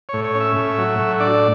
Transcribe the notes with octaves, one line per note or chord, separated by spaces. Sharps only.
A2 C#5
C#5
C#4
E5
A2
F#3
A2
D4 D5